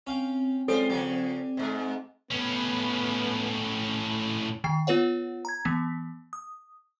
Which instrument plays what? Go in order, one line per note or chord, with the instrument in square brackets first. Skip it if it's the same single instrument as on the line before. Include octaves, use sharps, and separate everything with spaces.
[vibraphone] C4 [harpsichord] C#4 F5 G5
[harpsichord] G3 G#3 C#4 [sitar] F4 C5 [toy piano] A4
[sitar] C#3 F3 [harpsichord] G4 D5 G#5
[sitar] G#2 G#3
[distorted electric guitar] A2 C#4 [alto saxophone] B3
[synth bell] D#3 G5 C7
B3 F4 B4 C#5 F#5
A#5 G#6
E3 B3 B6
D#6